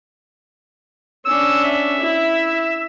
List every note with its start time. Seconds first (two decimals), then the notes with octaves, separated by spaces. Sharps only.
1.25 C#4 D4 E6
1.65 E5
2.00 E4